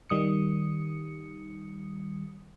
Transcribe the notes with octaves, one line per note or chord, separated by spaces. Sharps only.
D#3 G3 D#6 C#7